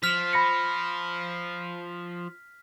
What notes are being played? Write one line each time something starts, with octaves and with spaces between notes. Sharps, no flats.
F3 F6 B6
B5 A#6 C#7